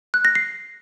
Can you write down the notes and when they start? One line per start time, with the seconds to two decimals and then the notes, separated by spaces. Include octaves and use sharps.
0.14 F#6
0.25 A#6
0.35 C7